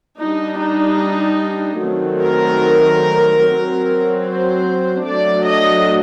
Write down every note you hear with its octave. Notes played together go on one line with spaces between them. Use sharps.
G3 D4 D#4
D#4
D#3 F#3 A3 C4
A#4
F#3 C4
C5
F#3 A3 D4 D5
D#5